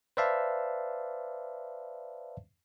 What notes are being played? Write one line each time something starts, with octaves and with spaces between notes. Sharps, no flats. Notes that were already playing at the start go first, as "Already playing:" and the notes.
B4 C5 D5 E5 F5 A5